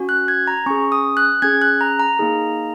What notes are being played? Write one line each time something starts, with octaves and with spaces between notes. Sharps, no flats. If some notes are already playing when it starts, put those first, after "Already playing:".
Already playing: C#4 F#4
F#6
G#6
A#5
C#4 G#4 C#6
D#6
F#6
C#4 G#4 G#6
F#6
A#5
A#5
A#3 D#4 G#4